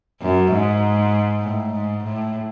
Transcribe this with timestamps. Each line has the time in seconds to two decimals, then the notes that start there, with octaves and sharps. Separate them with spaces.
0.22 F#2
0.52 G#2
1.42 A2
1.73 G#2
2.04 A2